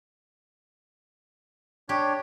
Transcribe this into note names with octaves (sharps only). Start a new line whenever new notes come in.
D4 G4 C#5